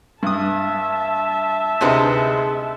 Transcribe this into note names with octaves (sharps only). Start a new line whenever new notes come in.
G2 E5 A5 D#6
D2 C3 G#3 D#4 E4 B4